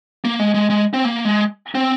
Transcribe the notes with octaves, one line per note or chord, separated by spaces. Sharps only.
A#3
G#3
G#3
G#3
C4
A#3
G#3
C4